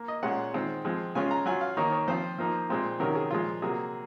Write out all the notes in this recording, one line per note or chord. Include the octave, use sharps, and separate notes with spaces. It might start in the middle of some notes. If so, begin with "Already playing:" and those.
Already playing: A#3
D#5
A#2 G#3 C#4 F4 F#5
D#3 G#3 C4 F4
F3 G#3 C4
C#3 G#3 C#4 F4 G#5
A#5
F#3 C#4 F4 G#5
F5
D#3 A#3 D#4 C#5
C#5
F3 C4 F4 C5
F3 A#3 D#4
A#2 G#3 C4 F4
C3 D#3 F#3 C#4 A#4
G#4
A#2 F3 G#3 F4
C3 F#3 A#3 G#4